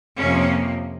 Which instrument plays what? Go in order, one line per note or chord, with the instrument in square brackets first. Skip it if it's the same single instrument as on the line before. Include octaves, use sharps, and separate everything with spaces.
[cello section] F2 C3 F3 A#3 C#4